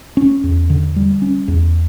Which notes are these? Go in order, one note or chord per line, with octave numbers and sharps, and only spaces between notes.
C#4
E2
D3
G3
C#4
E2